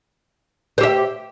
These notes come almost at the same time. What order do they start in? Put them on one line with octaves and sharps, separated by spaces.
C5 G4 E5